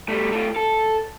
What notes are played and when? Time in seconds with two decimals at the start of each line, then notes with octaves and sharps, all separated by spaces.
0.09 G3 A3
0.32 A3 F4
0.56 A4